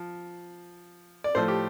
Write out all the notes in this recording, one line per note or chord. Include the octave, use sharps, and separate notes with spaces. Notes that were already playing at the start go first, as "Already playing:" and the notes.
Already playing: F3
D5
A2 F3 A3 C5
G4